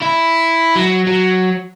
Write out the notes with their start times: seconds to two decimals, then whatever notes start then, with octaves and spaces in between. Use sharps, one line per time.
0.02 E4
0.76 F#3
1.07 F#3